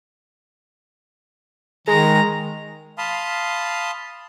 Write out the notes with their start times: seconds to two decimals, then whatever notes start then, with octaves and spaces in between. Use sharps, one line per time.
1.87 D#3 G#3 A#5
2.98 F5 A5 B5 C6 D#6